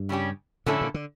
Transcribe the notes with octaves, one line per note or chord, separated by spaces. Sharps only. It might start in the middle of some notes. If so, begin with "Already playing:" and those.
Already playing: G2
C#3 G3 C#4 G4
A2 D3 F3 C#4 E4 A4
A#2
D3